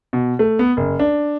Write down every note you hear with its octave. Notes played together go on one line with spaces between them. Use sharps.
B2
A3
B3
F#1
D4